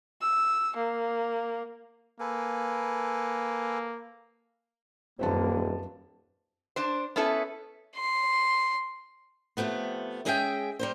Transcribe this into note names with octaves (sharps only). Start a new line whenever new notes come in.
E6
A#3
A#3 A4 B4 G#5
D#1 F#2 A#3 C4 B4 A5
D4 C5
B3 C#4 E4 A4 B4
C6
C3 E3 F3 A3 B3
G#3 C#4 G#4 D#5 E5 G5
G3 D#4 C5